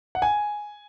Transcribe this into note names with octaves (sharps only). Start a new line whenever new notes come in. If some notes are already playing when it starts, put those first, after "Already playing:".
F#5
G#5